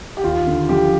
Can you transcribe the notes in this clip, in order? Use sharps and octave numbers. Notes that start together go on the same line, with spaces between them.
G4
D#2 F4
D3
F3 G4